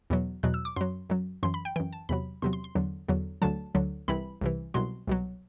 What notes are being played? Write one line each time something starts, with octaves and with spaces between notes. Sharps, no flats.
E2 B2 F#3
E2 B2 F#3 F#6
E6
D6
F#2 F#3 C6
F#2 F#3
F#2 E3 C6
B5
G5
F#2 E3 G5
A5
E2 C3 F#3 B5
E2 C3 F#3 C6
C6
C6
E2 D3 F#3
E2 D3 F#3
D2 D3 F#3 A5
D2 D3 F#3
C2 C3 E3 B5
C2 C3 E3
C2 B2 F#3 C6
C2 B2 F#3